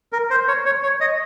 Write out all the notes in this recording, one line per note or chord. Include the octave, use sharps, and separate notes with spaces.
A#4
C5
C#5
C#5
C#5
D#5